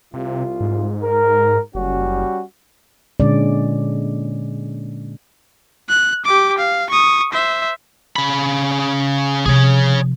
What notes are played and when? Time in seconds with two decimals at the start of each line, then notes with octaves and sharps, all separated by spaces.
0.14 C2 C3 F4
0.61 G#2
1.03 A#4
1.75 F#1 G3 C#4 F#4
3.20 A#2 D3 G#3 C#4 D5
5.89 F#6
6.25 G4 D6
6.58 F5
6.90 C#6 D#6
7.32 C5 E5
8.16 C#3 B5
9.46 C3 F3 G#4 C#5